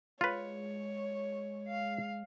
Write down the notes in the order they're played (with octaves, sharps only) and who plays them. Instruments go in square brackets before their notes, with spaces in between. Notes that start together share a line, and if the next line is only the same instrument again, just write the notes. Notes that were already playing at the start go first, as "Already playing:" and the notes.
[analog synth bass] G#3 [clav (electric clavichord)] F4 B4 [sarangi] C#5
[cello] F5